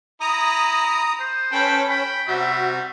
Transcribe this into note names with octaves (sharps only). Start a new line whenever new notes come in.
E4 A#5 D#6
C5
C#4 A4 B4 G5
G5 B5
C3 G3 F#4 E5